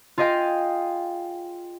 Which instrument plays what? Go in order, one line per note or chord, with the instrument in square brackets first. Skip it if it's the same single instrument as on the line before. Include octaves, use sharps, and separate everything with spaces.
[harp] F4 G#4 D#5 F5 G5